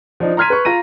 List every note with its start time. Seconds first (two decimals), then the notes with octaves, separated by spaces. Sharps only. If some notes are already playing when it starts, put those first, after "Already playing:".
0.20 F3 D4 D#4
0.37 A#5 C6 F6 G#6 B6 D#7
0.50 B4 C#6
0.65 F4 A#5 A#6 D#7